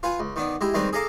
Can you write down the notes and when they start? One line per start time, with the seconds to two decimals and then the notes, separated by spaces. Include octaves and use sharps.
0.03 F4 B4 F#5 G#5
0.20 C#2
0.36 D#3 B3 D4
0.61 G#3 E4 G4
0.74 D#3 G3 G#3 C4 A#4 B4
0.93 G#4 A4 D#5 F5 A#5 D6